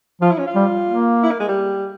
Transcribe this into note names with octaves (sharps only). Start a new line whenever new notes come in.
F3 F4
E4
C#4
F4
G3
A#3
E4
A#3
G#3
G3